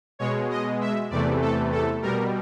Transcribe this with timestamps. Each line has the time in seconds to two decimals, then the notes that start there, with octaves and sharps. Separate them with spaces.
0.19 B2 G#3 C#5
0.50 D#5
0.81 E5
1.10 E2 C3 E3 A3 D5
1.41 A4
1.72 A4
2.02 B2 G3 A#4